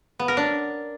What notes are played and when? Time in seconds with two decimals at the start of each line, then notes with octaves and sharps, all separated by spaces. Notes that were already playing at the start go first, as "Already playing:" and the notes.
0.19 B3
0.28 A#4
0.37 D4